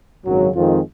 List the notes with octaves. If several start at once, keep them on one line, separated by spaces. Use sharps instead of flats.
G#1 F#2 C#3 F#3
F2 D#3 G#3 C4 F4